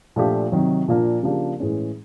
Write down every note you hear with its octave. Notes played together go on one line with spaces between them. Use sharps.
A#2 F3 A3 D4 G4
C3 D#3 F#3
A#2 F3 A#3 D4 F4
C#3 F3 A#3 D4 G4
A2 E3 G#3 C#4